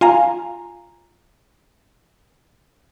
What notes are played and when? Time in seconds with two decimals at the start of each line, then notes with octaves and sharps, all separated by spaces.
0.01 F4 F5 G#5 A#5